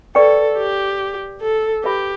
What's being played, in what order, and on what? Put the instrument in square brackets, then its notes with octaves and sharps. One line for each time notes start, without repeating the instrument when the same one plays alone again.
[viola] A4 [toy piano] B4 D5 G5 C#6
[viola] G4
A4
[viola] G4 [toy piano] B4 E5 B5